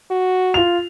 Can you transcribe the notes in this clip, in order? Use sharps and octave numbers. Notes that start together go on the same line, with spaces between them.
F#4
F4 F7